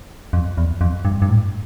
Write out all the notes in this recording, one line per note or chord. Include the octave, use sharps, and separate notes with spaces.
F2
E2
F2
G2
G2
A2